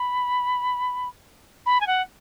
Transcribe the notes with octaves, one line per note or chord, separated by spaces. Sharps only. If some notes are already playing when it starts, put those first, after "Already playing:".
Already playing: B5
B5
G#5
F#5